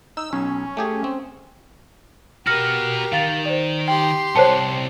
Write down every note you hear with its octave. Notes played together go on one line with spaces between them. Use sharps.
D#4 E6
B1 C#4
A3 G4 G#4
C4
F#4 G4 A#4 B4 F6 A#6 C#7
D#3 F5 A6 F7
C5 D5
G4 G5 C6
C2 C5 C#5 A5 C#7